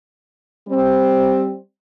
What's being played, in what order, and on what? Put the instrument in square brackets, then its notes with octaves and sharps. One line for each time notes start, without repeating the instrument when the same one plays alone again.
[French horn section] G3 C4